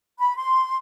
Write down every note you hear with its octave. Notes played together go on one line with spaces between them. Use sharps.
B5
C6